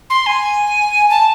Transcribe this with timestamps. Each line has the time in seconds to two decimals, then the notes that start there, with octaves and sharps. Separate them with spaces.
0.10 C6
0.26 G#5
1.10 A5